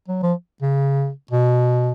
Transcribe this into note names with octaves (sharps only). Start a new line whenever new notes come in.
F#3
F3
C#3
B2